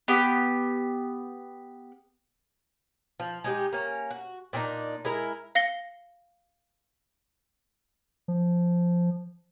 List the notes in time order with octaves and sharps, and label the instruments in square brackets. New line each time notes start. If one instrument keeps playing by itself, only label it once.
[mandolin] B3 G4
[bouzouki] F3
G#3 D#4 G4
A#3 C#4
F#4
A#2 C4 D4 D#4
G#3 E4 A#4
[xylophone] F5 A#6 C#7 G7
[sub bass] F3